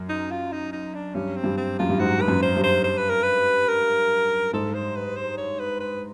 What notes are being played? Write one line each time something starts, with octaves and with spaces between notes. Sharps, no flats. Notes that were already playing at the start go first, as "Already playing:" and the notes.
Already playing: F#2
D#4
F4
D#4
D#4
D4
G2 C#4
C4
G2
C4
F#2 F4
G2
G#2 F#4
B4
F#2
C5
G2
C5
C5
B4
A#4
B4
A#4
G#2 A4
C5
B4
C5
C#5
B4
B4